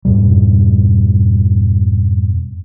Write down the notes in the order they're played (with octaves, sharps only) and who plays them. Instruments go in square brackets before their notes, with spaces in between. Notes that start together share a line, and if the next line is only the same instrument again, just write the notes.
[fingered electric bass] F2 G#2 B2 G3